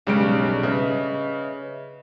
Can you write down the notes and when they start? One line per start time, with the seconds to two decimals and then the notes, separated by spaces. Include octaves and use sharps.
0.07 B1 G2 C#3 G3 G#3 D7
0.63 C#3 B4 D#5 E5